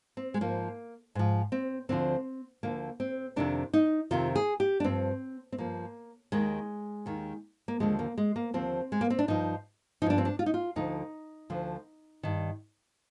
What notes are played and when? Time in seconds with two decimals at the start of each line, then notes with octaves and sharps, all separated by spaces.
0.17 C4
0.34 G#3
0.41 G#2 F3 A#3
1.15 G#2 F3
1.52 C4
1.89 D2 D3 F3 C4
2.63 D2 D3 F3 A#3
3.00 C4
3.36 F2 C3 D#3 D4
3.73 D#4
4.11 F2 C3 D#3 F4
4.36 G#4
4.60 G4
4.80 D4
4.84 G2 F3 C4
5.52 C4
5.58 G2 F3 A#3
6.32 D#2 D#3 G#3
7.06 D#2 D#3
7.68 A#3
7.80 D#2 D3 F3 G#3
7.99 A#3
8.18 G#3
8.36 A#3
8.54 D#2 D3 F3 C4
8.92 G#3
9.01 A#3
9.10 C4
9.19 D4
9.28 G2 F3 D#4
10.02 F3 D#4
10.06 G2 D4
10.18 C4
10.25 D4
10.39 F4
10.46 D#4
10.54 F4
10.76 D2 D3 F3 D#4
11.50 D2 D3 F3
12.23 G2 D#3